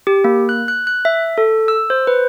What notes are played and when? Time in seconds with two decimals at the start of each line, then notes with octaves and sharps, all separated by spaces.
0.07 G4
0.24 A#3
0.49 F#6
0.68 F#6
0.87 F#6
1.05 E5
1.38 A4
1.68 E6
1.90 C5
2.07 B4